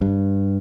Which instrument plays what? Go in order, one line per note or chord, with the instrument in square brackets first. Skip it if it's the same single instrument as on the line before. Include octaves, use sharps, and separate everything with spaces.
[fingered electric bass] G2